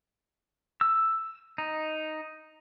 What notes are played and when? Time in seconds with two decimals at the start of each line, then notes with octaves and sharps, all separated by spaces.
0.81 E6
1.58 D#4